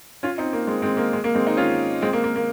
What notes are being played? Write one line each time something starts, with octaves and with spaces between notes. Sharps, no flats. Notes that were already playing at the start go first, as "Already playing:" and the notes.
C#4 F4
C4 D#4
A#3
G#3 C4
G#3 C4
A#3
G#3
A#3
G#3 C4
C4 D#4
C#4 F4
G#3 C4
A#3
A#3
A#3